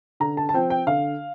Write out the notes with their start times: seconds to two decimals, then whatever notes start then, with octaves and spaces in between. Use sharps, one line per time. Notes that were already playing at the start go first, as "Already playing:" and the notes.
0.20 D3 A#5
0.37 A5
0.49 A5
0.53 F3 C4 G5
0.70 G5
0.87 D3 F5